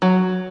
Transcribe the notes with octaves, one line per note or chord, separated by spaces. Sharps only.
F#3